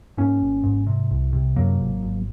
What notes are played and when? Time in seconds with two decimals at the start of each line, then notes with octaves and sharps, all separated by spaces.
0.17 G#2 A#3 C#4
0.41 G#1
0.63 G#2
0.87 C3
1.11 C2
1.33 C3
1.56 F#2 F#3 A#3
1.79 G#1
2.02 G#1